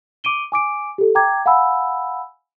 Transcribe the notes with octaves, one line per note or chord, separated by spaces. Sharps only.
D6 D7 D#7 G7
G#5 D6 D7
G4 A4
G5 A#5 D6 G#6
F5 F#5 G#5 B5 E6